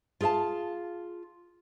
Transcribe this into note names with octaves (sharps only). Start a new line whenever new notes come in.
F4 G#4 A4 F5 A5